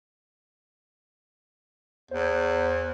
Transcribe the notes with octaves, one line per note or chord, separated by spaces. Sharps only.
E2 C5